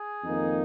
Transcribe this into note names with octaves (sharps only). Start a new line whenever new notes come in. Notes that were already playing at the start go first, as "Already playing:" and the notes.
Already playing: G#4
F2 D#3 A#3 D#4